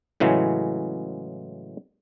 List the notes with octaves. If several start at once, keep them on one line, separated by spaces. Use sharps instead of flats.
A2 C#3 E3 F#3 G#3